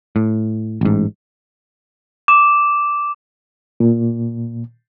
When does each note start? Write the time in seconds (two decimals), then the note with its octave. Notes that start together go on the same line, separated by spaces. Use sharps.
0.16 A2
0.81 A1 G#2
2.28 D6 E7
3.80 A#2